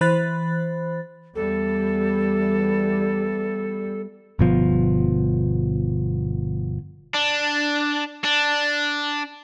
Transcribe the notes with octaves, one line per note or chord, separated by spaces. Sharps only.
E3 C5 B5 F#6 A6
E2 G3 A4
G1 B2 F3
D4
D4